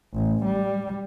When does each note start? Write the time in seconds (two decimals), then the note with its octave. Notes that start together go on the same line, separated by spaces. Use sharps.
0.13 A1
0.45 G3